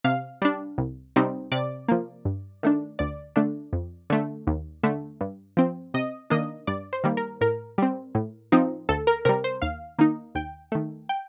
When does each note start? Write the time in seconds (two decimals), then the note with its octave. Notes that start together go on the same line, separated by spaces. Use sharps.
0.04 C3 F5
0.42 G3 D4
0.78 C2
1.16 C3 G3 C4 D#4
1.52 C3 D5
1.88 F3 A#3
2.25 G2
2.63 D#3 A3 D4
2.99 D2 D5
3.36 D3 A3 D4
3.73 F2
4.10 D3 A3
4.47 D#2
4.83 D3 A3
5.21 G2
5.57 F3 C4
5.94 C3 D#5
6.30 D#3 A#3 D4 D#5
6.67 G2 D5
6.93 C5
7.04 D#3 G3 A#3
7.17 A#4
7.41 A2 A#4
7.78 G3 C4
8.15 A2
8.52 F3 C4 D#4
8.89 D2 A4
9.07 A#4
9.25 C3 G3 A#4
9.44 C5
9.62 D#2 F5
9.99 D#3 A#3 D#4
10.35 D#2 G5
10.72 D#3 A3
11.09 G5